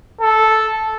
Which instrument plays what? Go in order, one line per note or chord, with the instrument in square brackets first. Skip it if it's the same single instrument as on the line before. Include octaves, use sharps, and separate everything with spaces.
[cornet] A4